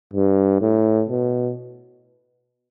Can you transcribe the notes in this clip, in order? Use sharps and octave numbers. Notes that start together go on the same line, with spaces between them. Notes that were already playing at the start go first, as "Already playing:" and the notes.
G2
A2
B2